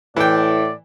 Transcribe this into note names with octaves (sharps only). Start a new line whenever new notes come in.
A2 E3 D5 G5